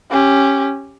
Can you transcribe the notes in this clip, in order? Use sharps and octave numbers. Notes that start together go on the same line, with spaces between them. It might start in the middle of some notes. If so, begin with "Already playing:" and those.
C#4 G4